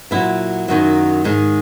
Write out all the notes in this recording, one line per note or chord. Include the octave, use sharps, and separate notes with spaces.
A#2 E3 F#3 E4
F#2 D#3 F#3
G#2 D#3 G#3